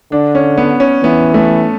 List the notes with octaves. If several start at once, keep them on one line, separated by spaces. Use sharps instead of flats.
D3 D4
C#4
B3
C#4
E3 B3
A3